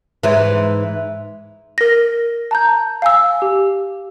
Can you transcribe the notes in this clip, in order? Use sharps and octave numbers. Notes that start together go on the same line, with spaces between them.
G#2 E3
A#4 A#6
A5 A#5 G6
F5 G#5 E6
G4